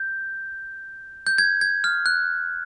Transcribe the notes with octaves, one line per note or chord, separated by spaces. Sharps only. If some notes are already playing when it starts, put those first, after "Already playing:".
Already playing: G6
G6
G#6
G#6
F6
F#6